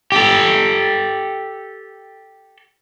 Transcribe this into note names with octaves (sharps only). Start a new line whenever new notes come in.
G4 A4